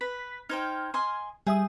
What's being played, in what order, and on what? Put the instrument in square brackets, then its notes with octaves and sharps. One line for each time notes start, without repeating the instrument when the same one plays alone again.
[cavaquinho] B4 [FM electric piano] B6
[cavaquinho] D#4 C5 G5 [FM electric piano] F6 G#6
[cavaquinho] D#5 G#5 C6
[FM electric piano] G3 E5 D#6 [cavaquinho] G#4